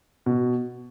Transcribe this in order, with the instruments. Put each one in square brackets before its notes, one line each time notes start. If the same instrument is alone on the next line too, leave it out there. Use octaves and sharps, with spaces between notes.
[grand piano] B2